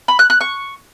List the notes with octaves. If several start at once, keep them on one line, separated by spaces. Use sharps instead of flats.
B5
F#6
F#6
C#6